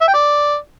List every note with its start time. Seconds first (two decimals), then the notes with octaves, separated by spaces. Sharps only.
0.01 E5
0.08 G5
0.14 D5